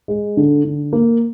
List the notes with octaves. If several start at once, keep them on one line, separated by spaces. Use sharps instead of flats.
G#3
D3
D3
A#3